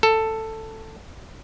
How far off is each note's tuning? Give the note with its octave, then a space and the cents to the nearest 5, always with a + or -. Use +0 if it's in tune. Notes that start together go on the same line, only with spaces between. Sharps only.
A4 +10